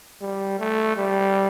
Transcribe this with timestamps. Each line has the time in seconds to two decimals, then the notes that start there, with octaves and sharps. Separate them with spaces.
0.22 G3
0.59 A3
0.97 G3